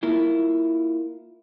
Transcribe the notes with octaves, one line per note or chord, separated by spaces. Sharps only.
A#3 E4 F4